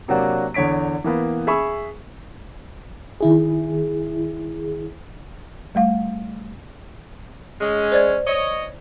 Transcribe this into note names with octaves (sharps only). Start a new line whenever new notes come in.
C3 F#3 A#3 D4 F#4
E2 D3 C#5 B6 D7
E3 A#3 B3
G#4 E5 B5 C#6 E6
D#3 E4 G#4
G3 A3 F5
G#3 C#4
C5 D5 G#6
C#5 D#5